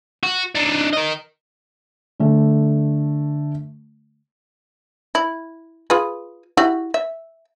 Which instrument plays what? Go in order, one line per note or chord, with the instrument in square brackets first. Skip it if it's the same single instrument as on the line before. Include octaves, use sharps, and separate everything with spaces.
[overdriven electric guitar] F#4
D4 D#4
A#4 D#5
[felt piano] D3 A3
[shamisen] E4
F4 G#4 B4
E4 F#4 G4
E5